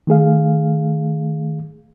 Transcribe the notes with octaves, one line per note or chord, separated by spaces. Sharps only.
D#3 A3 G#4 F5